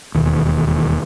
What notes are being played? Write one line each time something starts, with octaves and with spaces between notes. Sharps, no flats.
E1 D#2